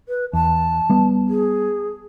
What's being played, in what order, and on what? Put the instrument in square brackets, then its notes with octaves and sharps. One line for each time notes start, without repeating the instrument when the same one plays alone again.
[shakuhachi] B4
[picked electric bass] E2 [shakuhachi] A5
[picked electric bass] G3 B3
[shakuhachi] G#4